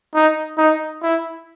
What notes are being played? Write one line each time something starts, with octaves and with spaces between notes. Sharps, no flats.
D#4
D#4
E4